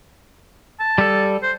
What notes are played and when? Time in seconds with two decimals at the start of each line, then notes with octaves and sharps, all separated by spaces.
0.80 A5
0.98 G3 A4
1.43 C5